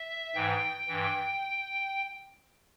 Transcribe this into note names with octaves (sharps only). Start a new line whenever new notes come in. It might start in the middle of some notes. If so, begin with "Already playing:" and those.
Already playing: E5
G#2 E3 G5
G2 E3